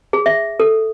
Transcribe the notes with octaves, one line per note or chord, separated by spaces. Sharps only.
G#4
E5
A4